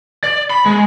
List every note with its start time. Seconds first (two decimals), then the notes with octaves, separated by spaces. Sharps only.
0.24 D5
0.50 B5
0.66 G#3